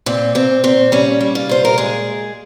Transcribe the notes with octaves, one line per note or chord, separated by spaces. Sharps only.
A#2 C4
A#2 C4
A#2 C4
G3 C#4
G3
F4
A#2 C5
A#4
G#3 G#4